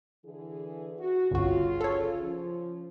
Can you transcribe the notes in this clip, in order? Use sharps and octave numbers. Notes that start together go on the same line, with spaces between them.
D3 E3 G#4
F#4
G1 C2 C#3 F4 F#4
A4 C#5
F3 C#4